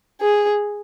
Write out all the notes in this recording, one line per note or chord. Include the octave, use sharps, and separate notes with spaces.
G#4